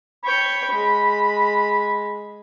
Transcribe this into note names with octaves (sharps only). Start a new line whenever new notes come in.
C#5 G5 B5
G#3